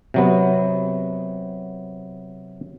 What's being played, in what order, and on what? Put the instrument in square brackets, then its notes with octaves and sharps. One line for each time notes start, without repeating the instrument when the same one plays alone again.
[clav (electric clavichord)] C3 F#3 B3